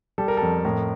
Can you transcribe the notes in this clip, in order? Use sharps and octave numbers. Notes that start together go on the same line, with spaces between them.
G3 A4
A#4
F2 A4
A2 A#4